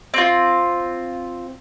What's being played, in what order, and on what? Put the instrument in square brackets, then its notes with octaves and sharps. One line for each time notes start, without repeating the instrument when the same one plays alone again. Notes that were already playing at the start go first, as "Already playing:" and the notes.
[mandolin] C4 F4